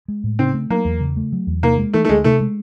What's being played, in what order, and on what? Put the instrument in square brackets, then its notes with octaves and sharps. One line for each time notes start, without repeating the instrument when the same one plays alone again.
[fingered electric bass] G#3
A2
[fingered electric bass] C#3 [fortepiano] C4
[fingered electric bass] A3
[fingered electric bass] F#3 [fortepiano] A#3
[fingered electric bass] E2
C#3
A3
F#3
E2
[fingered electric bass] C3 [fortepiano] A#3
[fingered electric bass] G#3
[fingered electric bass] E3 [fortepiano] A3
[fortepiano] A3
[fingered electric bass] D2 [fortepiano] G#3
[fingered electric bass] C3 [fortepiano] A3
[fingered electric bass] G#3